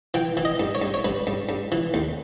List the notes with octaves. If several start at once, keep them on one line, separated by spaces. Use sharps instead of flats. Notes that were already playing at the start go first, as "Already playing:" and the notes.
E3 G5
E3
D#5
G2
C#5
G2
C#5
G2 B4
G2
G2
E3
D#2